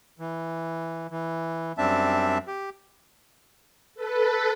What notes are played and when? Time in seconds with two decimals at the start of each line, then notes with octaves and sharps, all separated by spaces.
0.19 E3
1.11 E3
1.78 F#2 G3 C4 D4 E5 A5
2.47 G4
3.95 A4 B4